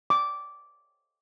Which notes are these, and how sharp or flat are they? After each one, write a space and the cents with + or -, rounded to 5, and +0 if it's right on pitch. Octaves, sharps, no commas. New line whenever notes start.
D6 -10